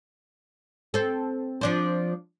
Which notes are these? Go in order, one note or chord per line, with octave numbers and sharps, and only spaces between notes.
C4 A4
F3 D4 C5